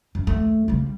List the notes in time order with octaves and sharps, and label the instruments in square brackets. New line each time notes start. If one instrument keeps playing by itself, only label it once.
[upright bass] F#2
D#2 A3
C#3 G3